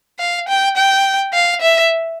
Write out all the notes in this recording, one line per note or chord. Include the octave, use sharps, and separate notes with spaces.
F5
G5
G5
F5
E5